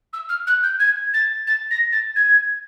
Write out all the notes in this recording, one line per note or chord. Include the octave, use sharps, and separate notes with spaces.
E6
F6
F#6
G6
G#6
A6
A6
A#6
A6
G#6